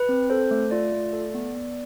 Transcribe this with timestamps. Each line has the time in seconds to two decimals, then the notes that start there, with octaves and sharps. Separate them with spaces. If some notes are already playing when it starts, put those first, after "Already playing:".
Already playing: B4
0.09 C4
0.30 A4 C5
0.51 A3
0.71 F4 D5
0.92 A3
1.13 A4
1.34 B3
1.55 B3